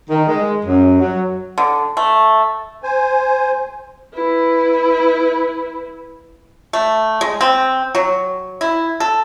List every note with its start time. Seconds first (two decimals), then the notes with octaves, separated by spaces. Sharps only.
0.10 D#3
0.28 G#3
0.65 F#2
1.01 F#3
1.58 D3
1.97 A3
2.83 C5 G#5
4.14 E4 B4
6.73 A3
7.21 G#3
7.41 C4
7.95 F#3
8.61 E4
9.00 A4